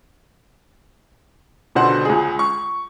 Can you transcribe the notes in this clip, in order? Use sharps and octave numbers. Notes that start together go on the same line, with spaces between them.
C#2 B2 D3 C5 F#5 C6
C#2 G#4
C#6